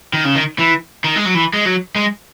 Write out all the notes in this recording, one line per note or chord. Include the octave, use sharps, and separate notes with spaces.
D#3
C#3
D#3
E3
D#3
G#3
F#3
E3
G#3
F#3
G#3